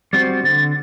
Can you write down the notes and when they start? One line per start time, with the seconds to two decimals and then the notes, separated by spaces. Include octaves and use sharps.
0.13 G3 C4 F#4 C5 A6
0.43 D3 A6